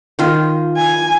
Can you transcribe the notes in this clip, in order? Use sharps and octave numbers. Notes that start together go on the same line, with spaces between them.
D#3 F4
G#5